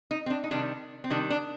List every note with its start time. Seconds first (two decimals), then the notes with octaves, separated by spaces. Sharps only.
0.11 D#4
0.26 C4
0.30 D4
0.44 D#4
0.51 C3 D#3 G3 D4
1.04 C4
1.10 C3 D#3 G3 D4
1.30 D4